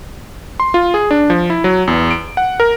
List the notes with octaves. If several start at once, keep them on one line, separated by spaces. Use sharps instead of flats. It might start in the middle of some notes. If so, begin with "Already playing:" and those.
C6
F4
G#4
D4
F3
E4
F#3
E2
D7
F#5
A#4